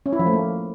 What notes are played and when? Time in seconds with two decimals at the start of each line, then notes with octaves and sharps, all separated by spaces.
0.06 C#4
0.13 E4
0.19 F3
0.26 A3
0.33 A#3